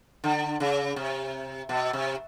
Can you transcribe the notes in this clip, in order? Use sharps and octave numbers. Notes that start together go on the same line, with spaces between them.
D3
C#3
C3
B2
C3